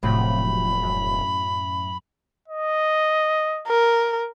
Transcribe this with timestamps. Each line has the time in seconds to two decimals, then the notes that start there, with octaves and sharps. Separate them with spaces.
0.03 E1 A2 C3 F3 F#3 B5
0.83 F#2
2.48 D#5
3.68 A#4